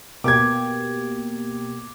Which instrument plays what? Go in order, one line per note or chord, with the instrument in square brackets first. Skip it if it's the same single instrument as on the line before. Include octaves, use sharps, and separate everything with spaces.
[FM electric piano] B2 A#3 G4 [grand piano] D6 G#6